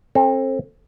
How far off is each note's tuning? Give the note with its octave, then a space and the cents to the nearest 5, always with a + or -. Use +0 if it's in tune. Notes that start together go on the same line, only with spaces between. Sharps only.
C4 +30 A4 +0